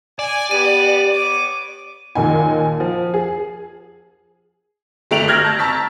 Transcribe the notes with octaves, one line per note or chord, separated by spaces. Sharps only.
D5 G#5
B3 G4 B4 D#7
B3 C#5 D6
D#2 A#2 D#4 G#5
F3
G#4
G1 A3 G5 D7 F7 F#7
E6 F6 G6 G#6 A#6
A5 G6
A5 A#5 C#6 E6 A6 B6